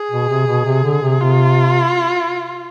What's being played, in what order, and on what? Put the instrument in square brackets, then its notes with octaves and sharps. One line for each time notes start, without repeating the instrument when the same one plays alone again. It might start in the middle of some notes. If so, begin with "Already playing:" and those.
Already playing: [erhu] G#4
[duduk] B2
C3
B2
C3
D3
C3
[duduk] C3 [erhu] F4